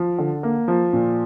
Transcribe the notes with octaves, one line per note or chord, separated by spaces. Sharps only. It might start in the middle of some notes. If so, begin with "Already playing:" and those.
Already playing: F3
D3
A#3
F3
A#2